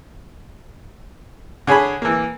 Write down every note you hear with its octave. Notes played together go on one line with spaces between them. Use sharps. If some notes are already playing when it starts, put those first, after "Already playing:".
D3 G#4 C#5 G#5 B5
E3 A#3